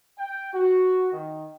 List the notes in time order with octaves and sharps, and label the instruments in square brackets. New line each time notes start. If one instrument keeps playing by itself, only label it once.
[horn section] G5
F#4
D#3